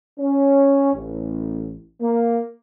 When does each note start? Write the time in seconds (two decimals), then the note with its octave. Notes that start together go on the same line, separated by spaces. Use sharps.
0.19 C#4
0.94 A1
2.01 A#3